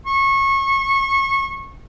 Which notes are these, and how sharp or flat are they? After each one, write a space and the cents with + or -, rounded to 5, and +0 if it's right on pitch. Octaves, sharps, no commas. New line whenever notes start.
C#6 -25